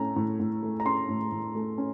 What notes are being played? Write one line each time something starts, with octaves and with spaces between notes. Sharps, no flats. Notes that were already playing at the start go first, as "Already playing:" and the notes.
Already playing: A2 A3 C#4 A#5
A2
A2
A3
A#5
C#4 C6
A2
A2
A3
C#4